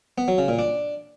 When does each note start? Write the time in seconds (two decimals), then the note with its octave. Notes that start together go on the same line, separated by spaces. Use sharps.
0.18 B3
0.28 F#3
0.38 C#3
0.48 A#2
0.59 D4